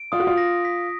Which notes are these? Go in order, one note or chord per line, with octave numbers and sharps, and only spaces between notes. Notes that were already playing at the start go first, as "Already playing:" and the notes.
Already playing: D7
F4 D#6
F#4
F4
A#6
B6